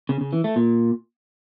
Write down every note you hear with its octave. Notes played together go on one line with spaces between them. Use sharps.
C#3
C#3
E3
A3
A#2